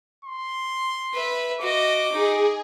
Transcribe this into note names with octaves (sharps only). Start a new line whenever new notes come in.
C6
B4 E5
F#4 D#5 D6
D#4 G#4